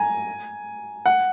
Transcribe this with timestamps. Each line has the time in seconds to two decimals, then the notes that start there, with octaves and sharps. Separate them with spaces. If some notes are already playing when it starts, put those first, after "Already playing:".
Already playing: G#5 A#5
1.06 F#5